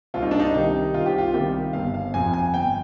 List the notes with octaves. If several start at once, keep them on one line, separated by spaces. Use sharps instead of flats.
C2 F4
D#4
D4
D#4
C3 D#3 G3 D#4
C2 F4
G4
F4
C3 D#3 G3 G4
G1 F5
F5
F2 C3 G#5
G#5
G1 G5